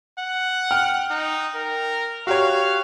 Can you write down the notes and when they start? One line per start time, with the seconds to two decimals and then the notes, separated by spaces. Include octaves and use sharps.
0.18 F#5
0.71 G5 F6
1.10 D#4
1.55 A#4
2.27 F#4 G4 C#5 F5